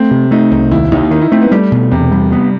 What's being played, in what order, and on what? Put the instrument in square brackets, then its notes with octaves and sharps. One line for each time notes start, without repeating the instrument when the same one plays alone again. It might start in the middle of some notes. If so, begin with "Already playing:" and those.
Already playing: [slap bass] A3 [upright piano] C4
[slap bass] C3
[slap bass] A3 [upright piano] D#4
[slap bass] C2
[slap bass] D#2 [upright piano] E4
[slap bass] D#2 [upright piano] D#4
[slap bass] D#3 [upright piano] D#4
[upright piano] E4
[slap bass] A3 [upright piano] C4
[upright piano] B3
[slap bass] G3 [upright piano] A3
[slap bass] B2
[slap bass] E2 [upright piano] C3
[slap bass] G3
B3